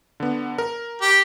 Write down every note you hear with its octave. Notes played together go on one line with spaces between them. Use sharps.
D3 B3
A#4
G4